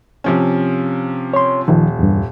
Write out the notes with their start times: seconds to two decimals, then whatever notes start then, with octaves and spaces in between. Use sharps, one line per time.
0.24 C3 F3 C#4
1.34 C#5 C6
1.68 D#1 D#3 F3
1.99 E2 G2